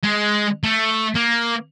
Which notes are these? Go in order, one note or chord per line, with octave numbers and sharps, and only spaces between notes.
G#3
A3
A#3